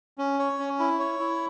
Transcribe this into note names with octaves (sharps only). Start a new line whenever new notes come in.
C#4
C#5
C#4
E4
C#5
E4